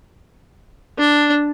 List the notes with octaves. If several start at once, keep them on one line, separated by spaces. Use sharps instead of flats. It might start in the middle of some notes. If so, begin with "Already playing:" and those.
D4